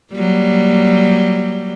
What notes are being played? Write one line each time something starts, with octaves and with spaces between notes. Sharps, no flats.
F#3 G3 A#3